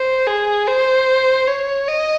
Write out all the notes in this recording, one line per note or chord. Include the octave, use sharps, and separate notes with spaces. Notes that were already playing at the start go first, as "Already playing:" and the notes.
Already playing: C5
G#4
C5
C#5
D#5